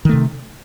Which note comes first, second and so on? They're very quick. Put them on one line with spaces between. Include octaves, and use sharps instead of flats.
D#3 A3 C3